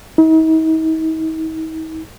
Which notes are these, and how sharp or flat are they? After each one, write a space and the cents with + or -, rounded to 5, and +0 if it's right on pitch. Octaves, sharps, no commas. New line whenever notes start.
D#4 +45